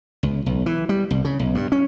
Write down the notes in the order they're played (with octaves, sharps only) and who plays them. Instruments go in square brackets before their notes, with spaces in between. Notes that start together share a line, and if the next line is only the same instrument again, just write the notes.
[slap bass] C#2
B1
E3
G3
C2
C#3
B1
G2
C#4